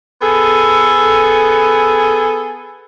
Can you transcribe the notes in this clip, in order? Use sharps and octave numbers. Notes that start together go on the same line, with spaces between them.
B3 G#4 A4